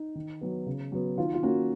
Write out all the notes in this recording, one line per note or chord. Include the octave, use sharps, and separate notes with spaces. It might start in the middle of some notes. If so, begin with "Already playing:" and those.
Already playing: D#4
D#3
F#3 B3
C#3
F#3 B3
D#3 F4
F4
A#3 C#4 F#4